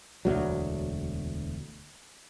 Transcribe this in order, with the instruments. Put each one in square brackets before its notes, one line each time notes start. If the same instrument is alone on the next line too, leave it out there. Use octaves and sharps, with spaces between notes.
[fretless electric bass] E1 D2 F#3